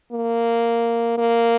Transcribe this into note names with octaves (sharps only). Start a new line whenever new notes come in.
A#3
A#3